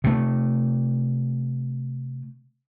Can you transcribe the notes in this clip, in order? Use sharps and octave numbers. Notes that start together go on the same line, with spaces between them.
C3 A3